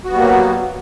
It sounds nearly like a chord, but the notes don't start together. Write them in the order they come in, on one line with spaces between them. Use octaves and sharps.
F#4 B3 G3 A#3 F#3